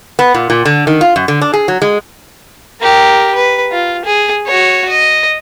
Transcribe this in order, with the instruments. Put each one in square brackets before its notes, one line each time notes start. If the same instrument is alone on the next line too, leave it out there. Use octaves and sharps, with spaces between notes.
[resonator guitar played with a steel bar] B3
A#2
A#2
D3
D#3
F4
F#2
D3
D4
G#4
F#3
G#3
[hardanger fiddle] G4 A#4
B4
F4
G#4
F#4 C#5
D#5